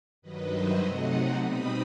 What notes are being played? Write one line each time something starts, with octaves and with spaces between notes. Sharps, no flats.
G2 D#3 F#3 B4 D#5
C5 E5
C3 F#3 A3 C4 D#4 D#5 F#5
B2 G3 C4 D#4 B5 D#6